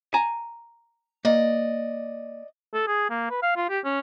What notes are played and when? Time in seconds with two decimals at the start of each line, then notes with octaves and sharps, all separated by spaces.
0.14 G#5 A#5
1.25 A#3 D5 D#5
2.74 A4
2.87 G#4
3.10 A#3
3.30 B4
3.43 F5
3.56 F4
3.69 G4
3.85 C#4